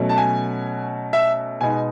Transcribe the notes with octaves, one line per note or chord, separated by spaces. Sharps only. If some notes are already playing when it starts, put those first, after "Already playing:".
Already playing: B2 F#3 A3 C#4
A5
G#5
E5
B2 G#3 B3 D#4 G#5